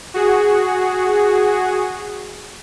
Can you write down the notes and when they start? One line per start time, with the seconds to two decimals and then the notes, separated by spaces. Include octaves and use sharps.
0.14 F#4 G#4